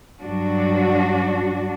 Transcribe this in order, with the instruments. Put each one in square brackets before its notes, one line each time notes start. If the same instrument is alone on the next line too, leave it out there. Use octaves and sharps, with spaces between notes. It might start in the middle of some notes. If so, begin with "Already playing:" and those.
[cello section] G2 F#3 D4 F#4